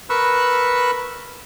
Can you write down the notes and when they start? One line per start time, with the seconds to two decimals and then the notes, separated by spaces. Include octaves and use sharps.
0.10 A#4 B4 B5 C#6 E6 F#6